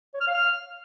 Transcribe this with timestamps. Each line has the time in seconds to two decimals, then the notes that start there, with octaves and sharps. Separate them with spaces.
0.14 C#5
0.20 F6
0.27 F5
0.34 F6